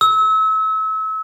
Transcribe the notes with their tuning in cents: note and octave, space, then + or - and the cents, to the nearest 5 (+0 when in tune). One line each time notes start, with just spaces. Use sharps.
E6 -35